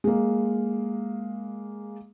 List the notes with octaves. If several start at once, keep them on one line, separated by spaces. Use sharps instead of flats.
G#3 A#3